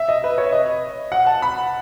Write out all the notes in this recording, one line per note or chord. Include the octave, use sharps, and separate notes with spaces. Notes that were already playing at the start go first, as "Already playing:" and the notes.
Already playing: E5
D#5
B4
C#5
D#5
F#5
A5
B5